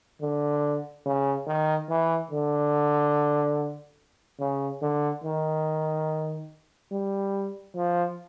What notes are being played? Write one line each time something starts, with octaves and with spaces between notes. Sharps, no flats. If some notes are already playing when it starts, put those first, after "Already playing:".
D3
C#3
D#3
E3
D3
C#3
D3
D#3
G3
F3